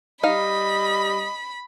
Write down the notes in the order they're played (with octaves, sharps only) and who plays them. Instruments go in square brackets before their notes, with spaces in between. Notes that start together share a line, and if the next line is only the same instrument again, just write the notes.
[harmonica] G3 [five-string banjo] D#4 F5 [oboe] D#5 [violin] B5